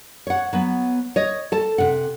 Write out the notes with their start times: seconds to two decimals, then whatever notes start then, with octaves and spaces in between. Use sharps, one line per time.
0.27 C#5 F#5
0.53 F#3 B3
1.16 C#5 D#5
1.52 A4 A5
1.78 C3 F#5